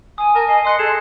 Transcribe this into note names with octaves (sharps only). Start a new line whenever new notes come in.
G#5 D#6
A#4 A5
D#5 C7
D#5 C6 D#6 F#6 C#7
G#4 A4 E7